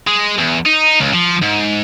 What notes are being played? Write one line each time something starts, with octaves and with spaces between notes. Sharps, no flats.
G#3
E2
D#4
C#2
F3
G#2